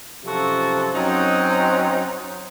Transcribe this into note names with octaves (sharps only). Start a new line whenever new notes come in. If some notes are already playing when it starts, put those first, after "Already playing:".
F#2 C3 F3 F#4 A4
F#2 F#3 C4 D#4